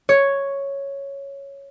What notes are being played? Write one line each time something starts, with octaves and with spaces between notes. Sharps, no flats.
C#5